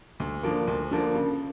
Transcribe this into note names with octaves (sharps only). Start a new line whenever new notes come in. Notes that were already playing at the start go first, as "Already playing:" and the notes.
D2
D3 F3 A#3
D2
D3 F3 A#3
C#3